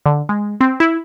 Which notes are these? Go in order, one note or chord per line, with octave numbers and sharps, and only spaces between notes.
D3
G#3
C4
E4